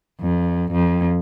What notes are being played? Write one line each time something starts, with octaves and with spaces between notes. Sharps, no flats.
F2
F2